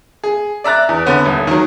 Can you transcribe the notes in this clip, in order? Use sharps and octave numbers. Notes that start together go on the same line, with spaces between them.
G#4
D5 E5 A#5 F#6 A6
E2
D3 B3 C#4
D#1
D#3 F#3